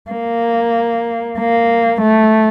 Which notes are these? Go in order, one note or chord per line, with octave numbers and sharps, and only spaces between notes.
A#3
A#3
A3